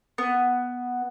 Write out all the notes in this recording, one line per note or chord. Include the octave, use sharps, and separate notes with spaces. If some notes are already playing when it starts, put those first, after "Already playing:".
B3